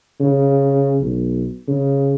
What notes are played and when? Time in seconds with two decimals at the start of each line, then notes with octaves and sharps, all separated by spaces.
0.20 C#3
1.01 B1
1.68 C#3